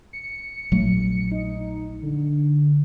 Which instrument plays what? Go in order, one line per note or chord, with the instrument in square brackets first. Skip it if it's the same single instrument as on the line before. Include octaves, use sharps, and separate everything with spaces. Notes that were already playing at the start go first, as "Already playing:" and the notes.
[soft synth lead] C#7
[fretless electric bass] A#1 F#3 A3
[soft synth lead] D#4
D3